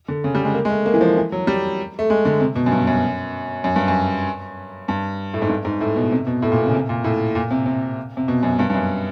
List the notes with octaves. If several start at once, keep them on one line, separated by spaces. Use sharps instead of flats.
D3
C#3
G3
G#3
A#3
G#3
A3
A#3
E3
F3
E3
F#3
G3
A3
G#3
D3
C3
B2
F#2
G2
F#2
F#2
G2
F#2
G2
A2
G#2
G2
G#2
A2
B2
C3
B2
A2
A#2
B2
C#3
C3
A#2
A2
A#2
C3
C3
C3
B2
F#2
G2
G2
F#2